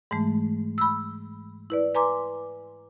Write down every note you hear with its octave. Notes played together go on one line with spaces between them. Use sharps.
G#2 E3 G#3 A3
B5 E6
E4 B4 D5
B4 G#5 A#5 C6 D6